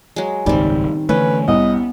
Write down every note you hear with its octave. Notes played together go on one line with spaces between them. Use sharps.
F#3 G#3
F#1 C#2 G#2 D#3 G3 C4
D3 E3 A3 C#4 B4
C2 B3 D#5